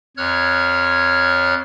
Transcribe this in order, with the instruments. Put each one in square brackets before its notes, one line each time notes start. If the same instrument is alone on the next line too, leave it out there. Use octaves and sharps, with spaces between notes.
[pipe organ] F2 C#5 F6 F#6 G#6